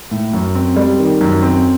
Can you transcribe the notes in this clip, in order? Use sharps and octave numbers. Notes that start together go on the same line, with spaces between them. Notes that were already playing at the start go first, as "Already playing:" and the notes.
A2
F#2
C4
G3
D#3
F#2
C4